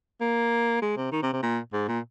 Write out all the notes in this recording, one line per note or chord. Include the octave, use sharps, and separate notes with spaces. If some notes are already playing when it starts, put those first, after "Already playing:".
A#3
G#3
C3
D#3
C3
C3
A#2
G#2
A#2